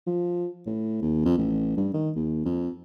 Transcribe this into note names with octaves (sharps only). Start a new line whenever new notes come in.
F3
A2
D#2
F2
A1
G2
D#3
D#2
F2